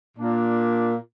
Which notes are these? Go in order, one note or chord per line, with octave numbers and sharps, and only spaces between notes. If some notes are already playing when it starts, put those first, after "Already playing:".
A#2 A#3 D4